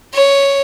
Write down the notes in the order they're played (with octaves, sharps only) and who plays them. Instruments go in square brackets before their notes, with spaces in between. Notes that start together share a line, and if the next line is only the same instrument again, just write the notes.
[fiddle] C#5